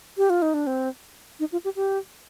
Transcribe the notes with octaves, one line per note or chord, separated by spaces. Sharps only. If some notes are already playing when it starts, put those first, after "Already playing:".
G4
F4
D#4
D4
C4
D#4
F4
G4
G4